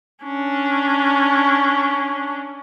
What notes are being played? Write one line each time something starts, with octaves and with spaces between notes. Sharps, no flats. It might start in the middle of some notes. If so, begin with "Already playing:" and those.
C#4 D4